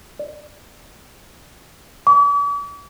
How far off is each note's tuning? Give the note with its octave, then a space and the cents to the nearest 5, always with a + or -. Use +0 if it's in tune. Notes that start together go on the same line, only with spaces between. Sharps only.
D5 +10
D6 -45